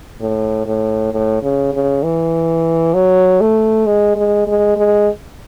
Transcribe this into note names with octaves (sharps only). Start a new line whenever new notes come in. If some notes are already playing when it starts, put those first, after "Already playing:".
A2
A2
A2
C#3
C#3
E3
F#3
A3
G#3
G#3
G#3
G#3